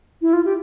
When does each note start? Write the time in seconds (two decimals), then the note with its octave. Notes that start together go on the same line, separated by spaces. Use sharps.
0.22 E4
0.33 F4
0.45 G4